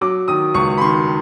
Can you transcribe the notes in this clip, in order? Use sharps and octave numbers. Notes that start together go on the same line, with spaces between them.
F#3 D6
D#3 D#6
C#2 C#6
B5
D#3 C6